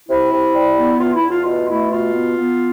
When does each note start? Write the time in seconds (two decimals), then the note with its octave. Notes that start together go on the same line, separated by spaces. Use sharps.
0.08 C3 E4
0.31 C3
0.54 G3
0.76 B3
0.99 E2 F4
1.14 E4
1.21 E2
1.30 F4
1.45 B2 F4
1.68 A3 E4
1.90 B2 F4
2.13 B3
2.36 B3